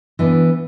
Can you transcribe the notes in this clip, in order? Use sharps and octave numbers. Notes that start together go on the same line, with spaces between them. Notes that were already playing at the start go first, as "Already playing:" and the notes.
E3 B3 D4